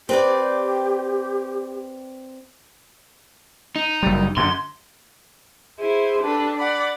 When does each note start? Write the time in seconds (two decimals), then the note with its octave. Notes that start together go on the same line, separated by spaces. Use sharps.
0.09 C4 G4 B4 D5
3.76 D#4
4.03 F#1 G3
4.37 F#2 D3 C6
5.80 E4 G#4 C5
6.22 D4 G4 A4 B4
6.56 D5 F#5 B5